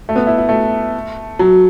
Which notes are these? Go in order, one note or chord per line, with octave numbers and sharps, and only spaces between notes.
A3
B3
E4
E4
A3
F#3